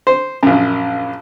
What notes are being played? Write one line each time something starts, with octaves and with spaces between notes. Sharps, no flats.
C5
A#1 F#2